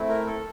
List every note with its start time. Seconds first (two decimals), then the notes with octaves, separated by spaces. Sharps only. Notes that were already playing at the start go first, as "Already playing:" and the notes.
Already playing: A3 C4 E4
0.09 A#4
0.27 A4